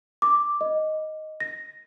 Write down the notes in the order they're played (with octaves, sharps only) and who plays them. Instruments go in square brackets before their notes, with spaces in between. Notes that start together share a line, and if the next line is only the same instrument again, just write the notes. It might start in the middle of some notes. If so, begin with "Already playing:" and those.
[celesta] D6
D#5
A#6